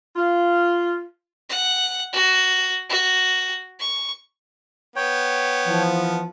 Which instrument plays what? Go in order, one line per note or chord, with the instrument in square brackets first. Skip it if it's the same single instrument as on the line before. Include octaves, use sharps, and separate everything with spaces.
[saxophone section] F4
[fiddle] F#5
F#4
F#4
C#6
[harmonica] B3 [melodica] C#5 G5
[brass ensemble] E3 F3